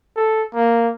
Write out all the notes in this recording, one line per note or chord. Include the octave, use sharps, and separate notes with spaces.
A4
A#3